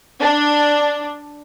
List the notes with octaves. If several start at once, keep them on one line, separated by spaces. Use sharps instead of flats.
D4